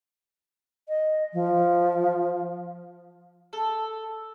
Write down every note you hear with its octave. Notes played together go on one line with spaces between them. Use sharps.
D#5
F3
A4